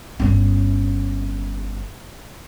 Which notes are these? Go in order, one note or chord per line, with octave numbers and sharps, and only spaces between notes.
G1 C#4